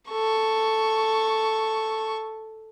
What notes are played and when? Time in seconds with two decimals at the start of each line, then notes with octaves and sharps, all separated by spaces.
0.10 A4 C#6